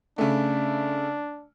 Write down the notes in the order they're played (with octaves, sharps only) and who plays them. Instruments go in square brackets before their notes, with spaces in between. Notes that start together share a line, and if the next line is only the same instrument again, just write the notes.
[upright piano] C#3 A3 [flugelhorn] D4